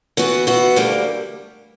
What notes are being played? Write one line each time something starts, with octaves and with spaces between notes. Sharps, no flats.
E3 B3 F#4
E3 B3 F#4
D2 D3 G3 A#3